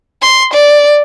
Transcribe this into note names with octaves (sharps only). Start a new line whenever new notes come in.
C6
D5